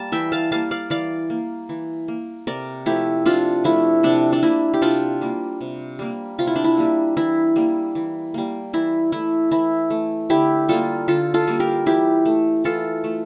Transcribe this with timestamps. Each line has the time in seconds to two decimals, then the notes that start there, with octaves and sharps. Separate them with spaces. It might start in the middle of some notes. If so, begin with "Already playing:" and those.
Already playing: G3 A#3 A5
0.12 E3 E5 G5
0.32 F5 A5
0.51 G3 A#3 F5 A5
0.71 D5 F5
0.90 E3 D5 F5
1.30 A#3
1.69 E3
2.08 A#3
2.47 C3 A#4 D5
2.86 F3 A3 E4 G4
3.26 C3 D4 F4
3.64 F3 A3 E4
4.03 C3 D4
4.33 D4
4.42 G3 A#3 E4
4.74 G4
4.82 C3 D4 F4
5.21 G3 A#3
5.61 C3
5.99 G3 A#3
6.38 C3 F4
6.47 E4
6.55 D4
6.64 E4
6.77 G3 A#3
7.17 E3 E4
7.56 G3 A#3
7.95 E3
8.34 G3 A#3
8.73 E3 E4
9.12 A3 E4
9.51 E3 E4
9.90 A3
10.30 D3 E4 G4
10.69 G3 A#3 F4 A4
11.08 D3 F4 A4
11.34 F4 A4
11.47 G3 A#3
11.60 G4 A#4
11.86 E3 E4 G4
12.25 A3
12.64 E3 F4 A4
13.04 A3